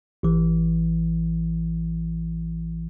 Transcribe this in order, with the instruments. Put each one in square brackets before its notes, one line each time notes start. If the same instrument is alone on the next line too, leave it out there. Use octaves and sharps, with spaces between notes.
[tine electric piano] A1 E3